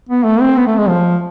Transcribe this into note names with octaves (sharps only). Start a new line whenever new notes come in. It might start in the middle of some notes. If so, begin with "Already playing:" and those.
B3
A3
C4
B3
A3
G#3
F3